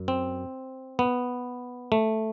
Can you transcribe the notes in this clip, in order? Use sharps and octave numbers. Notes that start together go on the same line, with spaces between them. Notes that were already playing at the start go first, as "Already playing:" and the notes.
Already playing: F#2
C4
B3
A3